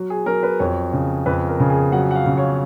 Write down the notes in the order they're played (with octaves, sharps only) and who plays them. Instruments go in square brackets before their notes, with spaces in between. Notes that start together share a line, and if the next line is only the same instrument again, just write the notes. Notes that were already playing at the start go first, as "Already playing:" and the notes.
Already playing: [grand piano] F#3
G#4
F#3 A#4
B4
F2 C#5
C#3
F2 B4
A#4
C#3
G#4
F#3 F#5
F#5
F5
C#3
C#5